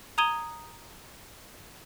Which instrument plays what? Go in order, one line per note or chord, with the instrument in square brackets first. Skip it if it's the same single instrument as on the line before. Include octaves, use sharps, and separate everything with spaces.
[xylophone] A#5 D#6 G#6 D#7 G7